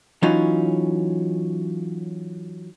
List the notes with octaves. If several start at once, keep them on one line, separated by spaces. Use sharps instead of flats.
E3 F#3 C#4 D#4 F4